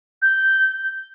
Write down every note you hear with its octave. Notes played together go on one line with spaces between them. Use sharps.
G6